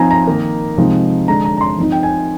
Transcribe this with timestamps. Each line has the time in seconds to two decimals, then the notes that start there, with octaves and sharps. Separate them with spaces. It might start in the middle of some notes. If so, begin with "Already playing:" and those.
Already playing: F3 C4 D#4 G#5 A#5
0.11 A#5
0.27 D#3 A#3 D#4
0.77 C3 F3 G#3 C4 D#4
1.28 D3 G#3 D4 A#5
1.45 A#5
1.57 A#5
1.61 C6
1.78 F3 C4 D#4
1.92 G5
2.03 G#5